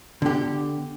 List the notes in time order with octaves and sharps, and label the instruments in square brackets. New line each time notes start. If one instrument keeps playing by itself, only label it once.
[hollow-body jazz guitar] D3 G4 [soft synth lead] B3